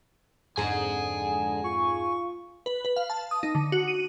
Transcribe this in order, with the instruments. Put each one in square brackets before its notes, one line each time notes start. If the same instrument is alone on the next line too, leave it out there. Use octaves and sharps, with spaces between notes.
[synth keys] F2 G#2 G#4 [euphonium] D3 [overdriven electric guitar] G#5 A#5
[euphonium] F4 [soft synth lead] C#6
[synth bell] B4
B4
F5
A5
D#6
D#4
D3
F#4
D#7